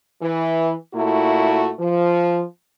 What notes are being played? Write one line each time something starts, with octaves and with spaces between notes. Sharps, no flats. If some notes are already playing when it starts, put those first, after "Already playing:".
E3
A#2 A3 E4 F#4
F3